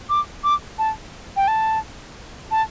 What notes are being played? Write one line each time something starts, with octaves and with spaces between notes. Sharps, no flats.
D6
D6
A5
G5
A5
A5